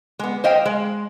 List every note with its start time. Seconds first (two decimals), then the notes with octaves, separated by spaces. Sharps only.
0.19 G#3 B3
0.44 C5 D#5 F5 G5
0.66 G#3